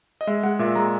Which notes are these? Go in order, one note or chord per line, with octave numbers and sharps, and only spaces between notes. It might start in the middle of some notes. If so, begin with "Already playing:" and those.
D#5
G#3 E5
G#3 F#5
A#2 E5
G#3 A#5